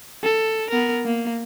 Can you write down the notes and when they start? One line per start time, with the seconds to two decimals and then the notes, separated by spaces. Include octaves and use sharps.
0.23 A4
0.70 B3 A#4
1.05 A#3